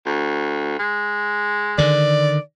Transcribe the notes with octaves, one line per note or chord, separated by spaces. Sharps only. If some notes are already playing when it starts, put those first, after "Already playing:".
D2
G#3
D3 D#3 D5